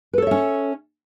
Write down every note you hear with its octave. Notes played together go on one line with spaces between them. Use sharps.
C#4 A4 B4 C#5 E5